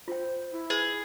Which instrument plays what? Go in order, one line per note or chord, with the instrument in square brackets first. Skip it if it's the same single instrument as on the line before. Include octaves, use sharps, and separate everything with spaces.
[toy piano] F4 G5 [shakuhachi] C5
[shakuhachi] E4
[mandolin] G#4 [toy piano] B4